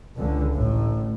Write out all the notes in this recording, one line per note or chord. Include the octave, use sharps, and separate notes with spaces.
C#2 D3
A1 A2